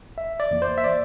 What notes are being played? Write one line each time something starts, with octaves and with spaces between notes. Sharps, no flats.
G1 E5
D5
F2 E3 A#3
C5
E5
D5